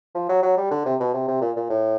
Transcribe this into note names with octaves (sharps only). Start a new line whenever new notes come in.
F3
F#3
F#3
G3
D3
C3
B2
C3
C3
A#2
A#2
A2